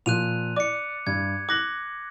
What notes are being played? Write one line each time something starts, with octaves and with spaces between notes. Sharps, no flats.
A#2 F3 F#6 D#7 F7
D5 D6 C#7
G2 G#6
D6 F#6 A#6 F#7